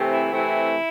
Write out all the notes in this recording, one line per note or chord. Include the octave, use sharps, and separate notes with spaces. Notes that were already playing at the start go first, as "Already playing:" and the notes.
Already playing: C3 E3 A3 C4
E4
C3 E3 A3 C4 E4